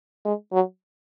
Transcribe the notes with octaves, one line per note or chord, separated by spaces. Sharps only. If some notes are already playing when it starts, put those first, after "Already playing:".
G#3
F#3